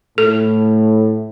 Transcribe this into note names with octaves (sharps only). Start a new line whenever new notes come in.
A2 A4